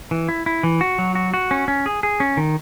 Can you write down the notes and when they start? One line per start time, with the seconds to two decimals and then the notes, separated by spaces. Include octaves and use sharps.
0.11 E3
0.29 E4
0.46 E4
0.63 E3
0.81 F#4
0.99 F#3
1.15 F#4
1.34 F#4
1.51 C#4
1.68 C#4
1.86 G#4
2.03 G#4
2.20 C#4
2.37 D#3